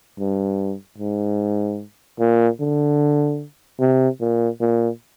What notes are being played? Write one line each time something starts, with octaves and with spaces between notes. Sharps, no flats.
G2
G#2
A#2
D3
C3
A#2
A#2